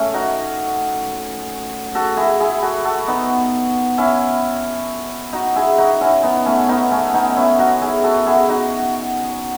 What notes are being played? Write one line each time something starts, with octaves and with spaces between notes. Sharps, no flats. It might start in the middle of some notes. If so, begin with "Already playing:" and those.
Already playing: A3 C#4
D#4 F#4
F#4 A4
E4 G#4
E4 G#4
F#4 A4
F#4 A4
B3 D#4
C#4 E4
D#4 F#4
E4 G#4
D#4 F#4
C#4 E4
B3 D#4
A3 C#4
B3 D#4
A3 C#4
B3 D#4
C#4 E4
D#4 F#4
E4 G#4
F#4 A4
E4 G#4
D#4 F#4